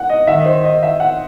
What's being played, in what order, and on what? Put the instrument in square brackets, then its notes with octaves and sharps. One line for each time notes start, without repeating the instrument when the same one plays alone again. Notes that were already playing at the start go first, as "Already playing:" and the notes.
Already playing: [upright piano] F#5
D#5
[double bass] D#3 [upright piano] E5
[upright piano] D#5
C5
D#5
E5
F#5